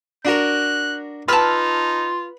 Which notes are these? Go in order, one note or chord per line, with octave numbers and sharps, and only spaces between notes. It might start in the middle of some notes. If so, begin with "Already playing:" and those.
D4 F#4 A#4 F#6
D#4 F4 B4 A5 E6 F6